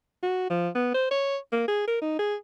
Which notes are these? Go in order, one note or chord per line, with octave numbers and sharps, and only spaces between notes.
F#4
F3
B3
C5
C#5
A#3
G#4
A#4
D#4
G#4